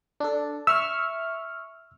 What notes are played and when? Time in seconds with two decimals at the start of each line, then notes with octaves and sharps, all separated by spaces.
0.20 D4 A4
0.67 E5 C#6 E6 F6